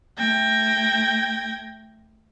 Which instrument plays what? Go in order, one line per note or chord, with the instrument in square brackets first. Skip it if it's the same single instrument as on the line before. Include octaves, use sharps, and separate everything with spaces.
[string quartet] A3 G5 G#6 A#6